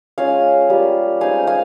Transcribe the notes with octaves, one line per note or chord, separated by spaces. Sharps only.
G#3 C#4 F4 F5 G#5
G3 A#3 F4
G#3 C4 D#4 F5 G#5
F5 G#5